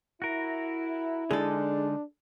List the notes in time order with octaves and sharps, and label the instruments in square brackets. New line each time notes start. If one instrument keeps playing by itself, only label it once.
[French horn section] E4 [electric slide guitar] F#4 A#4
[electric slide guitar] D3 G#3 D#4 [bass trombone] D4 [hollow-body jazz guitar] G#4 A4